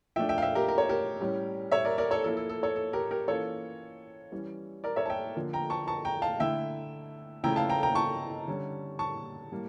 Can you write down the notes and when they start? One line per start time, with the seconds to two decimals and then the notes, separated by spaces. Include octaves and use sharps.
0.16 F3 A3 D4 E5 G5
0.29 E5 G5
0.38 F5
0.42 E5 G5
0.55 G4 A#4
0.68 A#4
0.78 C#5
0.89 G4 A#4
1.21 A2 G3 C#4
1.72 C#5 E5
1.85 A#4 D5
1.98 A#4 D5
2.11 A4 C#5
2.24 F3 A#3 E4 A4
2.37 A4
2.49 A4
2.63 A4 C#5
2.76 A4
2.93 G4 A#4
3.11 G4 A#4
3.28 E3 A#3 C#4 F4 A4 C#5
4.32 E3 G3 C#4
4.84 A#4 D5
4.96 C#5 E5
5.06 A5
5.10 E5 G5
5.35 D3 F3 A#3
5.53 G5 A#5
5.70 A5 C#6
5.88 A5 C#6
6.05 G5 A#5
6.22 F5 A5
6.40 D3 A3 E4 E5 G5
7.43 C#3 F3 A3 C#4 E4 G5 A#5
7.56 F5 A5
7.69 G5 A#5
7.83 G5 A#5
7.95 A5 C#6
8.47 D3 G3 C#4
8.99 A5 C#6
9.52 A2 G3 A#3